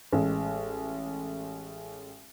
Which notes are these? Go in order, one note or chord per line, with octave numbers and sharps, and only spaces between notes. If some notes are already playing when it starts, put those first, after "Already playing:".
A1 G#3